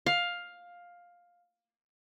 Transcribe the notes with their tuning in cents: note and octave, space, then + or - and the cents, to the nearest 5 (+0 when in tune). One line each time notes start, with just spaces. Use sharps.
F5 +10